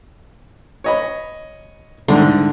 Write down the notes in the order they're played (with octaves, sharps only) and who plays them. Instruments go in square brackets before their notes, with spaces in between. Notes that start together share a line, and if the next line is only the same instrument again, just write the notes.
[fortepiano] C#5 D#5 B5
[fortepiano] C2 G#2 [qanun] D3